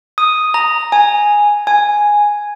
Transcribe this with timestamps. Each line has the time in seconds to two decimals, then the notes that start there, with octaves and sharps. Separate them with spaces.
0.18 D#6
0.54 A#5
0.92 G#5
1.67 G#5